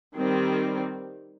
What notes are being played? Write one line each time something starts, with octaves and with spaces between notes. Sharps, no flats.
D#3 G3 C4